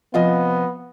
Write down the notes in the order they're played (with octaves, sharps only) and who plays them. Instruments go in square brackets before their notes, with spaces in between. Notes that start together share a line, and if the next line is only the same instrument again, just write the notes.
[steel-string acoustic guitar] C3 F3 G#5 [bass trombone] B3 [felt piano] F4 D#5